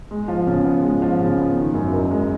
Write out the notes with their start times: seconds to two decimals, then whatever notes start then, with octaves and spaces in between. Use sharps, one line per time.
0.11 G#3
0.28 F3
0.47 C#3
0.64 B3
0.83 G#3
1.02 F3
1.19 C#3
1.38 B3
1.56 D#3
1.74 F#2
1.93 F#1
2.11 G#3